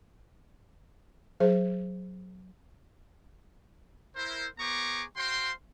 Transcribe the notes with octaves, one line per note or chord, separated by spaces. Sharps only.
F#3 G#4 C5
E4 A#4 C5
B3 G#4 C5 A#5 C#6 D6
F#4 C5 F5 G5 C6